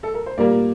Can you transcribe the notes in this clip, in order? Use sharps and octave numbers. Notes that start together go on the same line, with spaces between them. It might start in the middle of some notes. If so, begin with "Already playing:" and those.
A4
A#4
C5
A#2 G3 A#3 A#4 D5